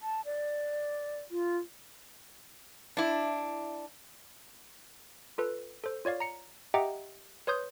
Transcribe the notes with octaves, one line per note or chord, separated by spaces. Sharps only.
A5
D5
F4
D4 E4
F4 A4 B4
A4 C5
F4 C#5 D5 F5
A#5 C#7
G4 D#5 E5 F#5 G5 A#5
B4 C#5 C6 D#6 G6